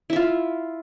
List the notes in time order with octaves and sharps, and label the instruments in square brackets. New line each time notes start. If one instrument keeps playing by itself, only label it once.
[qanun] E4
E5
F4